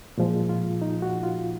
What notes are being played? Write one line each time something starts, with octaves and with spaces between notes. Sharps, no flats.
A#2 F3 G#3
F4
D#4
F#4
F4